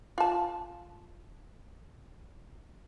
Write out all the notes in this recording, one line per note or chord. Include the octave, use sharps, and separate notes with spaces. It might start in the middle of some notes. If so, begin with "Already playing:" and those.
F4 A5